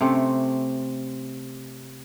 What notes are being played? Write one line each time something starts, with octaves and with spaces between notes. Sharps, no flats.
C3 A3 C4 C#4